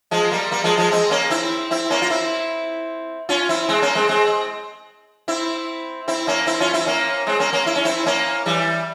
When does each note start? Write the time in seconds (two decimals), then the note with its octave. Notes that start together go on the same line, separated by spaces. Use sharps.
0.11 F3 G#3
0.31 G3 A#3
0.51 G3 A#3
0.64 F3 G#3
0.78 F3 G#3
0.91 G#3 C4
1.11 A#3 C#4
1.30 C4 E4
1.71 C4 E4
1.90 A#3 C#4
2.02 F4
2.10 C4 E4
3.29 C#4 F4
3.49 C4 E4
3.69 G#3 C4
3.82 A#3 C#4
3.95 G#3 C4
4.09 G#3 C4
5.28 C4 E4
6.08 C4 E4
6.27 A#3 C#4
6.47 C4 E4
6.60 C#4 F4
6.74 C4 E4
6.87 A#3 C#4
7.27 G#3 C4
7.40 A#3 C#4
7.53 A#3 C#4
7.66 E4
7.76 C#4
7.85 C4 E4
8.06 A#3 C#4
8.46 E3 G3